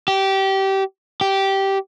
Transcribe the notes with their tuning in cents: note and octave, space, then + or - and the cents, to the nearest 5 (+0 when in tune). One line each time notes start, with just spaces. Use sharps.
G4 -20
G4 -10